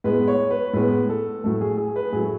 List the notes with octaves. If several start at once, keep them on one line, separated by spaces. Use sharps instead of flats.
A2 G#3 B3 B4
C#5
B4
A2 G#3 B3 B4
A4
A2 F#3 A3 A4
G#4
G#4
B4
A2 F#3 A3 G#4